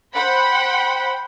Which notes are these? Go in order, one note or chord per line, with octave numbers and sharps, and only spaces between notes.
C5 F#5 G5 B5